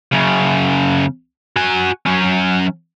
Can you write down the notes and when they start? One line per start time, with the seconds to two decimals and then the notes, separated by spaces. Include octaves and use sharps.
0.12 F#2 C#3
1.57 F#4 G#5
2.06 F#3 C#4